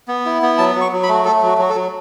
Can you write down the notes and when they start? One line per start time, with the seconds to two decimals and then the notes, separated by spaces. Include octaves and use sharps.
0.08 B3
0.25 E4
0.42 B3
0.58 F#3 A5
0.75 F#3
0.81 C#6
0.92 F#3
1.03 B5
1.09 A3 F#4
1.25 A3 A4
1.43 F#3 F#4
1.58 F#3 F#4
1.70 A4
1.75 F#3